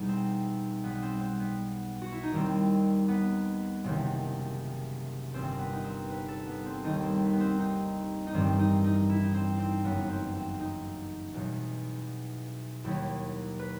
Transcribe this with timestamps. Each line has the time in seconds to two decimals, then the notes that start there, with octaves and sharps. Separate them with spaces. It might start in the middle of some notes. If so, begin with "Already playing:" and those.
Already playing: E2 B2 G3 D#4
0.08 C4
0.83 B1 B2 G3 B3
1.02 C4
1.21 C4
1.40 B3
2.02 F#4
2.12 E4
2.23 D#4
2.32 D#2 D#3 G3 C4
3.09 B3
3.84 F#1 E2 C3 D#3
5.34 G1 G2 D#3 C4
5.59 B3
5.73 D#4
5.84 C4
6.10 B4
6.28 A4
6.47 B3
6.66 C4
6.83 D#2 D#3 G3 D#4
7.03 C4
7.22 B3
7.33 B3
7.40 C4
7.59 D#4
8.27 D#4
8.33 A1 G2 D#3 G3 C4
8.59 D#4
8.84 D#4
9.09 E4
9.23 D#4
9.34 C4
9.59 C4
9.84 F#1 F#2 F#3 B3
10.09 C4
10.34 C4
10.60 D#4
11.34 E2 B2 F#3
12.84 D#2 D#3 F#3 E4
13.59 B4